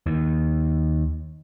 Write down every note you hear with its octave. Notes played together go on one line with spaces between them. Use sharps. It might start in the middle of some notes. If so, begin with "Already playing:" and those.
D#2